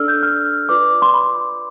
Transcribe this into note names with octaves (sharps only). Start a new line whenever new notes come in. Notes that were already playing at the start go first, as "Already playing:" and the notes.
Already playing: D4 A4 D5 E6 F6
G6
F6
F4 B4 D5 D6
C6
B5